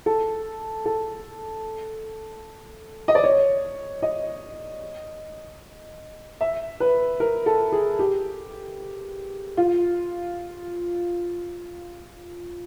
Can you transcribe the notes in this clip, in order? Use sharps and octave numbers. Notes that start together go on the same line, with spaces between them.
A4
A4
D#5
D5
C#5
D#5
E5
B4
A#4
A4
G#4
G4
F4